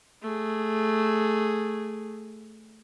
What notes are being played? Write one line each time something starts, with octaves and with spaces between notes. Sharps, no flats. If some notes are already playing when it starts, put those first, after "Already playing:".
A3 G#4